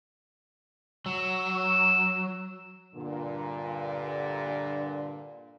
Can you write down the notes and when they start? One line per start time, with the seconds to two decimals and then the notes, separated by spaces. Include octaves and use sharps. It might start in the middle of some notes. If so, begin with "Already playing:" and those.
1.06 F#3 E6
2.95 G2 A#2 D3